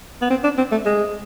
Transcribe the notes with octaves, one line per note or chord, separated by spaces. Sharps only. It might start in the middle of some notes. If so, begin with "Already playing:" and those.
B3
C4
D4
C4
A3
G#3